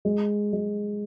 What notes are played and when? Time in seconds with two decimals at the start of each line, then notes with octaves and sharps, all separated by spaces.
0.05 G#3
0.53 G#3